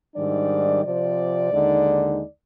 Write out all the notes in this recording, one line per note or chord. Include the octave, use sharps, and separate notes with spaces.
G#2 D#3 G3 D4 D5
C3 F3 C4 D5
D#2 D3 G#3 D#4